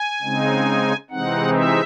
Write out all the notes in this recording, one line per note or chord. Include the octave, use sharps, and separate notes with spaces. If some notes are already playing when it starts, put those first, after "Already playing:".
Already playing: G#5
C#3 G#3 C4 D#4
C3 E3 G#3 C4 D#4 F#5
E5